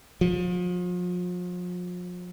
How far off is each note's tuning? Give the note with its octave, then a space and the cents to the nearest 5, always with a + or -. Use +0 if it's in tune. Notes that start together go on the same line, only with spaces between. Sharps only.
F3 +40